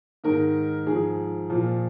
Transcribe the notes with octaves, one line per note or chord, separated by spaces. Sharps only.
G#2 D#3 A#4
G#2 F3 G#4
A#2 F3